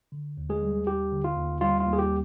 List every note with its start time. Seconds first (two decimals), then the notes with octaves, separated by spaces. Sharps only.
0.12 D3
0.37 D#2
0.49 G#3 G#4
0.63 G3
0.87 D#2 G4
1.12 D3
1.24 F4
1.36 D#2
1.61 G3 F4
1.80 F4
1.86 D#2
1.93 G#4
1.98 G4